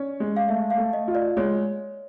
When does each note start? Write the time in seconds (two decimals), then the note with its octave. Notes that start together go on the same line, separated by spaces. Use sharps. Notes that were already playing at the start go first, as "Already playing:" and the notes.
Already playing: C#4 D5
0.20 G#3
0.37 F5
0.48 A3 E5
0.70 F5
0.78 A3
0.93 D#5
1.08 F4
1.15 D5
1.37 G#3 C#5